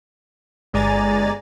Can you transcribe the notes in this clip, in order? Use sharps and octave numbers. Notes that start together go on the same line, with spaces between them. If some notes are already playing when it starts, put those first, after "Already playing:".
G1 G#3 D5 G#5 A#5 A6